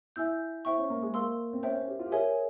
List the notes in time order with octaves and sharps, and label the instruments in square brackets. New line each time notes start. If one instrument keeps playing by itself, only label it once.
[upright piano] E4 [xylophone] E5 G#5 E6 G6
[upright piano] E4 [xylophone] C5 E5 G5 C#6
[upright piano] C#4
A#3
G#3
[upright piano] A#3 [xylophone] A#4 F5 C6 E6
[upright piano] C4
[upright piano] C#4 [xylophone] C5 E5 G5
[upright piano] C#4
G4
F4
G4
[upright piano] G#4 [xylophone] A#4 C#5 E5 G#5